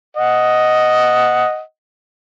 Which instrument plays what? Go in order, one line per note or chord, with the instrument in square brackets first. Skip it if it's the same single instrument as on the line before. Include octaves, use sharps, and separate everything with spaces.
[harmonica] D#5 F#5